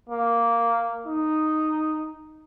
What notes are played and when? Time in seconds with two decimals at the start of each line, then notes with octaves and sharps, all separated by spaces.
0.09 A#3
1.06 D#4